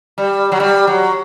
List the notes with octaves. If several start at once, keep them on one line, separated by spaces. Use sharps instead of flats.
G3
F#3
G3
F#3